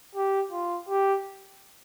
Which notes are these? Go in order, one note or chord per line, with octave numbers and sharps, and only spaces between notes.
G4
F4
G4